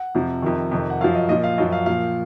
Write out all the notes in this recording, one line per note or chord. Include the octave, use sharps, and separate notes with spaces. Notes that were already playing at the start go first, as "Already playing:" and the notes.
Already playing: F#5
F2 C3 F3
F2 C3 D#3
F2 C3 D#3
F#5
F#2 F3 F5
D#5
A#2 F3 D#5
F5
F#2 F3 D#5
F5
A#2 F3 F5